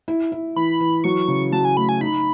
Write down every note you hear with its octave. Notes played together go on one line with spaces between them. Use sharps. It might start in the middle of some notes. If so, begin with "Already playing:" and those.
E4
E4
E3 B5
E3
F#3 C#6
C#3
F#3 A5
G#5
A3 B5
G#5
D#4 B5